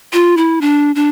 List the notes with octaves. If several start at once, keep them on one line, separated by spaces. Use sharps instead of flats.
F4
E4
D4
D4